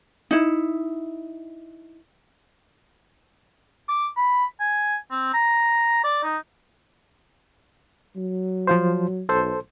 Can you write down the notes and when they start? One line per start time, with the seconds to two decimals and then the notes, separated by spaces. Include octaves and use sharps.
0.31 D#4 E4
3.89 D6
4.17 B5
4.60 G#5
5.11 C4
5.34 A#5
6.04 D5
6.23 D#4
8.17 F#3
8.67 F3 F4 C5
9.29 B1 A4 C5